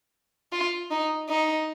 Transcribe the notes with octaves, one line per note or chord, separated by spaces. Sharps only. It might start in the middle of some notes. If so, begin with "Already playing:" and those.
F4
D#4
D#4